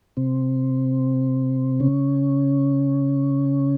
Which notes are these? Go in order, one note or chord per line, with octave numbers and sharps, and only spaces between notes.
C3 C4
C#3 C#4